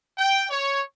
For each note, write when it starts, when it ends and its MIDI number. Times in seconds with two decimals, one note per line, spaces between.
0.18 0.46 79
0.51 0.81 73